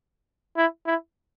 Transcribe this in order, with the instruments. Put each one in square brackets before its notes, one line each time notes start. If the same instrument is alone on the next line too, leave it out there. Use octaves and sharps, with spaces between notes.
[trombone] E4
E4